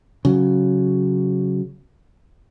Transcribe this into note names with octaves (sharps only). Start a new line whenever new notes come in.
C#3 F#3